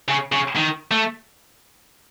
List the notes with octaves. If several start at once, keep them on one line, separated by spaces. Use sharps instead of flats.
C#3
C#3
D#3
A3